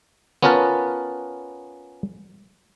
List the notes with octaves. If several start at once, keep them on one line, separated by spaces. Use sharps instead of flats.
B3 C#4 F4 A#4 B4 A5